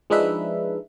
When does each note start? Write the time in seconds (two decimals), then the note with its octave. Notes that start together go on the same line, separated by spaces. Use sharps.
0.10 F3 G#3 D4 D#4 B4 E5